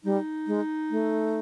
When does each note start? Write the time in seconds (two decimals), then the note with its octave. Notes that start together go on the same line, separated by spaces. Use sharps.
0.04 G3 D#4
0.47 G#3
0.91 A3